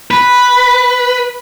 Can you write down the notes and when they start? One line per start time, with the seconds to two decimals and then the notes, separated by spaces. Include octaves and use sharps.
0.11 B4